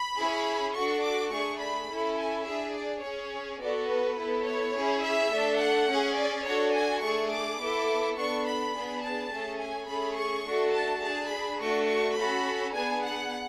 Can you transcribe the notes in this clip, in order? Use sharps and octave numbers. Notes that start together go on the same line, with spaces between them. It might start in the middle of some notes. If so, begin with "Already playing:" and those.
Already playing: B5
C#4 E4 G#4
D4 F#4 A4 C#6
D6
A3 D4 G#4 C#6
B5
C#4 E4 A4
G#5
D4 G#4 E5
D5
C#4 G#4 C#5
B3 F#4 A4 D5
B4
B3 E4 A4
C#5
C#4 E4 G#4
E5
A3 D4 A4
F#5
C#4 G#4
D5
D4 F#4 A4 C#5
G#5
A3 D4 G#4 C#6
D6
B3 E4 A4
B3 D4 A4 C#6
B5
B3 D4 G#4
A5
A3 C#4 G#4
G#5
A3 C#4 G#4 B5
C#6
A3 D4 F#4 A4
A5
D4 G#4 A5
B5
A3 D4 F#4 C#6
C#6
C#4 F#4 A4 B5
B3 D4 G#4 G#5
F#5